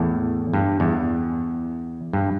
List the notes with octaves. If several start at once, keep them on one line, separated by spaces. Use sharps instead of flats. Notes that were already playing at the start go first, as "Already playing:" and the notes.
Already playing: E2 A2
G2
E2
G2